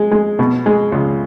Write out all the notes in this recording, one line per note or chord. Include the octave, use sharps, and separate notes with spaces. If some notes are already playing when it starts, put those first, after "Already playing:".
Already playing: G#3
G#3
B2
G#3
C#2